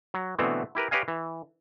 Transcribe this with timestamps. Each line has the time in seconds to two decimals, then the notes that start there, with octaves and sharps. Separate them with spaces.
0.14 F#3
0.38 B2 D3 E3 A3 B3 C4
0.75 E4 G4 A#4 B4
0.91 G4 B4 C#5 D#5 F5 G#5
1.08 E3